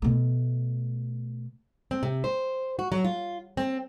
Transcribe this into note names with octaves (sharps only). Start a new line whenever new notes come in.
B2 A3
C4
C3
C5
F#4
F#3
F4
C4